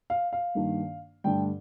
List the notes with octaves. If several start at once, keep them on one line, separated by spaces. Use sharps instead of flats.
F5
F5
G2 D#3 A#3 D4
G2 D3 A3 D4 G5